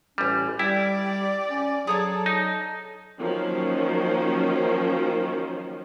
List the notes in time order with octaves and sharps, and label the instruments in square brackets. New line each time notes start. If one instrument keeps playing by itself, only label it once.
[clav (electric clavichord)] A1 G3 [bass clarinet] C#4
[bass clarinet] G3 [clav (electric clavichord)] E4 [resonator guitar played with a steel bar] G4 [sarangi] D5
[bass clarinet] C#4
[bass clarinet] F#3 [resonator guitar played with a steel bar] G#4 C#5 D5 [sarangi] A4
[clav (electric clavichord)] D#4
[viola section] D#3 F3 F#3 A#3 C#4 C5